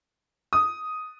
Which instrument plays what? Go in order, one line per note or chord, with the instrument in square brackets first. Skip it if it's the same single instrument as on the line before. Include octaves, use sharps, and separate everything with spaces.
[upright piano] D#6